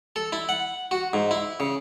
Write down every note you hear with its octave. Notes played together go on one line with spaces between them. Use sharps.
A4
E4
F#5
F#4
G#2
E4
C#3